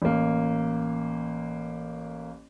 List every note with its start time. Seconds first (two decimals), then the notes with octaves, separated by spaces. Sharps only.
0.02 A1 A#3